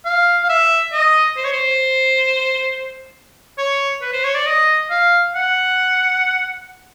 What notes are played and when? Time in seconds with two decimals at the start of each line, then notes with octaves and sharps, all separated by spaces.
0.05 F5
0.43 F5
0.49 E5
0.93 D#5
1.37 C5
1.44 C#5
1.53 C5
3.58 C#5
4.02 B4
4.13 C5
4.24 C#5
4.35 D5
4.47 D#5
4.91 F5
5.35 F#5